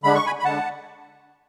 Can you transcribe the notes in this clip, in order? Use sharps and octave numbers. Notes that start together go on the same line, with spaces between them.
D3 G#3 D4 B5
C#6
G#5 B5
B5
D3 G#3 D4 F#5 A5